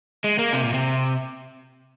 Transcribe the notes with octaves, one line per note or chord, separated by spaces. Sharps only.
G#3
A#3
C3
A#2
C3